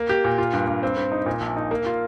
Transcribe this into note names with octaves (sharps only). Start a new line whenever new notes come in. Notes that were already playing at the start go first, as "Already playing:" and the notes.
Already playing: A#3
G4
A#2
F4
G2
G2
C4
C4
D#4
A#2
A#1
D#4
A#3
F4